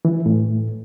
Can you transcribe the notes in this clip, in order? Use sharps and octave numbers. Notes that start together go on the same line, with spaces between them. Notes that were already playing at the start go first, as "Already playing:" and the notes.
E3
A2